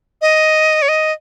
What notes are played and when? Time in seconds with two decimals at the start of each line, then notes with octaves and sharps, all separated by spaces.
0.22 D#5
0.82 C#5
0.89 D#5